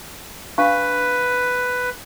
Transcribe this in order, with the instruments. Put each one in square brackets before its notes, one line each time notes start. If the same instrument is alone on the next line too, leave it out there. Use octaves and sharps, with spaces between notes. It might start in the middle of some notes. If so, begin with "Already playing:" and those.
[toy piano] D4 F5 C#6 [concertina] B4